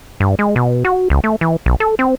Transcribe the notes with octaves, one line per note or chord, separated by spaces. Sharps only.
G2
G#3
B2
F#4
C#2
A3
E3
B1
A4
C4